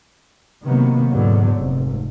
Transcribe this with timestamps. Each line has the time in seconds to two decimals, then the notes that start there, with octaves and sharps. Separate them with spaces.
0.63 C3 D#3 F#3 A#3 B3
1.12 E2 G#2 D3 F#3 B3
1.55 F1 G#2